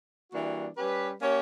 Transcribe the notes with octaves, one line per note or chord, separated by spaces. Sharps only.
E3 G3 A#3 D4 F#4
G3 C#4 G4 B4
A#3 C#4 G4 C#5